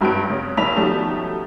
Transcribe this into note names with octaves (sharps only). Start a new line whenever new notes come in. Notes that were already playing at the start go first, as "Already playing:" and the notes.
G#1 G2 F#3 C4 F#6 D7
C#3
F1 B1 D4 B5 B6 F7
B2 D#3 F3 G3 A3 C#4